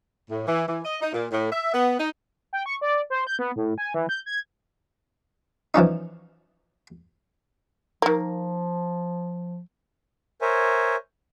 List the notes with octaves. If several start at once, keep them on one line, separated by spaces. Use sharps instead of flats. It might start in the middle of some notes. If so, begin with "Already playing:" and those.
A2
E3
E3
D#5
D#4
A#2
A2
E5
B3
D#4
G5
C#6
D5
C5
G6
B3
A2
G#5
E3
G6
G#6
E3 F3 C#4 D#4
D#3 F3 A#3
A#4 C5 C#5 E5 G#5